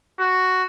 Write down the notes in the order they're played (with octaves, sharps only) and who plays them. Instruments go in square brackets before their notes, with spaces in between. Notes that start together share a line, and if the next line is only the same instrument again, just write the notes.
[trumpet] F#4